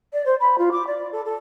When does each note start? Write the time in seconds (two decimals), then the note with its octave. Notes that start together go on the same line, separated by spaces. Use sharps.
0.13 D5
0.25 C5
0.40 B5
0.58 F4
0.71 D6
0.87 D5
1.12 A4
1.25 A4